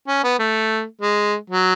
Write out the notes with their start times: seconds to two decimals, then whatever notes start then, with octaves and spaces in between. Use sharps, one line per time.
0.08 C#4
0.24 B3
0.39 A3
1.02 G#3
1.50 F#3